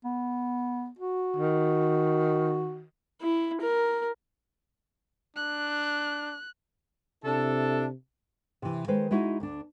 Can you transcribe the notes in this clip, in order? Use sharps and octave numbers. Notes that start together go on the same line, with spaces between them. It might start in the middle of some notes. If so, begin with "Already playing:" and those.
B3
F#4
D#3
E4
A#4
D4 F#6
C3 D4 E4 A4
C3 E3
D#3 G#3 B4 C5
G#3 D#4 E4 F#4
D2 D4